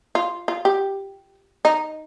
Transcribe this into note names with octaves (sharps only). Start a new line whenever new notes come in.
F4
F4
G4
D#4